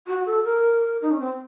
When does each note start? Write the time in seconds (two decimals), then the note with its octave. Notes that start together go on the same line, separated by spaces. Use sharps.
0.08 F#4
0.26 A4
0.44 A#4
1.02 D#4
1.11 C#4
1.20 C4